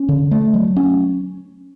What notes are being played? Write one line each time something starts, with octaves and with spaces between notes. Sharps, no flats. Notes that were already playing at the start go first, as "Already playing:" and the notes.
Already playing: C#4
D3
A3
F#3
C#4